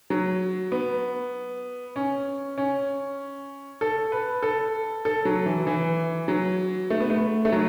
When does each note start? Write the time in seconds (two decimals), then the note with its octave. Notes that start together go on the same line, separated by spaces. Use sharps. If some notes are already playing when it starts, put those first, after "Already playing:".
0.10 F#3
0.72 B3
1.96 C#4
2.58 C#4
3.81 A4
4.12 B4
4.43 A4
5.05 A4
5.25 F#3
5.46 E3
5.67 E3
6.28 F#3
6.90 A3
7.00 B3
7.10 A3
7.45 A3
7.52 F#3